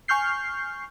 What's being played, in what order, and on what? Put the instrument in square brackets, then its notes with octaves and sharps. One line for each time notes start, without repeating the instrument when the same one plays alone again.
[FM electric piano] G#5 C#6 F6 G6 C7